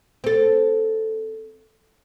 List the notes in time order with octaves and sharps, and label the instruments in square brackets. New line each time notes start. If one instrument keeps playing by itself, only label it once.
[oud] C4 A4